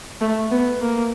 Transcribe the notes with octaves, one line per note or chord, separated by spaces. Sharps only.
A3
B3
A#3